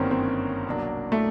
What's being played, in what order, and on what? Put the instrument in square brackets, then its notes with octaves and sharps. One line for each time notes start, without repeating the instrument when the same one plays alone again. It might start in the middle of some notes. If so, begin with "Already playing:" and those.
Already playing: [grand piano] G1 F#2 D#3 G3 A#3 [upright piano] C4 C#4
[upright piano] C4
[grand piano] C2 B2 F#3 A#3 D4
[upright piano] A3